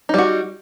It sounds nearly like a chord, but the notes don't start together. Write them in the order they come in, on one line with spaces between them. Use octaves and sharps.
D#4 G3 F#4